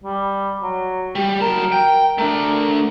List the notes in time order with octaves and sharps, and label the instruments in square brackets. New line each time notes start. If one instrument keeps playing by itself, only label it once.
[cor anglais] G3
F#3
[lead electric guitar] G3
[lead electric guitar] F#3 A5 [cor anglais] A#4
[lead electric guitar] G5
[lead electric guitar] A3 D4 [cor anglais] A#4